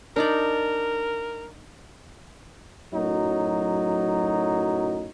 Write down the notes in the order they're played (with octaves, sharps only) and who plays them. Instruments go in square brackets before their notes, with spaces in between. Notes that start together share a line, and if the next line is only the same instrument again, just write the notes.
[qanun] D4 D#4 D5 [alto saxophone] A#4
[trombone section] F#2 A2 F#3 D#4